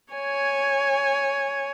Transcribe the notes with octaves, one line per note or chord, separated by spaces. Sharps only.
C#5 G#5